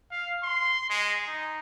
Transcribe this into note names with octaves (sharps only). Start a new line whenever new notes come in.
F5
C6
G#3
D#4